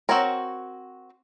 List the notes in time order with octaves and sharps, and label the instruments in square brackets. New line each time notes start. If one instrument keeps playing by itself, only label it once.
[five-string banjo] C4 F#4 A#4 C#5